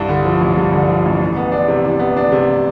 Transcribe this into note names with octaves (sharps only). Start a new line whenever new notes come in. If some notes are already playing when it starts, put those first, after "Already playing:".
Already playing: C2 G2
D3
F3
A1
G2
D3
F3
A1
E3
B3
D4
C3
E3
B3
D4
C3